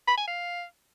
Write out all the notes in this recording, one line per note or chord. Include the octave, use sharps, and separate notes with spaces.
B5
G#5
F5